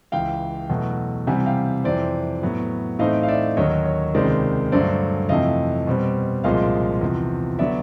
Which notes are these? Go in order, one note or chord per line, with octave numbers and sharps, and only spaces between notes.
C#2 C#3 E3 F5 G5
E2 B2 F#3 A3
C3 E3 G3 F#5 G#5
F5 G5
F2 C3 E3 C5 D5
A2 F#3 B3
A2 E3 A3 C4 D#4 D#5 F5
F5
D5 E5
D#2 D3 F#3 A#3 C#5 D#5
C#5
C#2 C3 D#3 G#3 C5 D5
G2 D3 F#3 A3 C5 D5
F2 C3 E3 A3 D#5 F5
B2 G3 C4
C2 A#2 F3 G#3 D#5 F5
E2 C3 F3
D3 F#3 B3 D5 E5